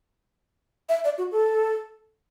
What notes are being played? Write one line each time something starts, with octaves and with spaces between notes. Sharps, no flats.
E5
D5
F#4
A4